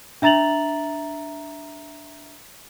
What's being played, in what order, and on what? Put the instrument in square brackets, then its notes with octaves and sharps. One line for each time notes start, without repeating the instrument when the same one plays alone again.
[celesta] D4 E5 A#5 A6 F7 F#7